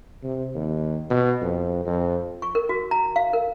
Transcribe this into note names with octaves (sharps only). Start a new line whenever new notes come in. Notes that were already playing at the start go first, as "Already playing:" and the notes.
C3
D#2
B2
F2
F2
C#6
A#4
F#4
A#5
F5
A#4